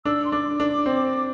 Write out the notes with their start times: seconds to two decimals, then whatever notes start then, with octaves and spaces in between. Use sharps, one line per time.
0.05 D4 E6
0.25 C6
0.32 D4 D6
0.60 D4
0.86 C4